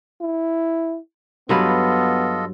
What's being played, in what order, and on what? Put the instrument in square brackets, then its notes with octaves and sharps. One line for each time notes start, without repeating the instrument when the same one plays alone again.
[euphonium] E4
[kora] G2 F#3 B4 [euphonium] B3 [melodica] F4 A4 D#5